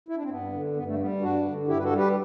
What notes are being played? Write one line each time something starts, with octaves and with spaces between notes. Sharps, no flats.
E4
D4
C4
G2 B3
D3
G2 B3
A3
G3 B3
G2 D4 F#4
D3
G2 E4 G4
B4
F#4 A4
G3
G4 B4